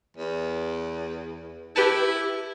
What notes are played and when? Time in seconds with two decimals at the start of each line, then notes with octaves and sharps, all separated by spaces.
0.17 E2
1.76 E4 G4 B4 A5